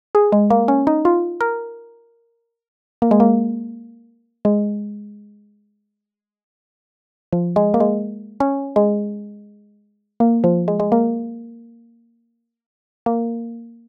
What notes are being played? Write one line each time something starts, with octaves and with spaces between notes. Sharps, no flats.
G#4
G#3
A#3
C#4
D#4
F4
A#4
A#3
G#3
A#3
G#3
F3
G#3
A#3
G#3
C#4
G#3
A#3
F3
G#3
G#3
A#3
A#3